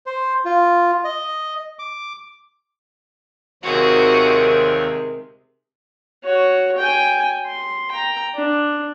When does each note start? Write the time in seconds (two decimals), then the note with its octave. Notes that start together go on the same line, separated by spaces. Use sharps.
0.06 C5
0.45 F4
1.05 D#5
1.79 D6
3.63 D#2 C3 D#3 G#3 C4 F#4 G#4 C#5
6.24 F#4 C#5
6.77 G5 G#5
7.46 C6
7.91 G5 A#5
8.35 D4